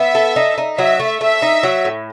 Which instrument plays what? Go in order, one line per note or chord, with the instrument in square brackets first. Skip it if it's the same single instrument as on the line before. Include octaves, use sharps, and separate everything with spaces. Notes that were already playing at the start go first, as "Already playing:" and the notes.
Already playing: [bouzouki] B3 [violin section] E5
[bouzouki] A4
D#4
D#4
[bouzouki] F#3 [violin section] E5
[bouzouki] A3
[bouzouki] A3 [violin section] E5
[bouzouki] D#4
F#3
A2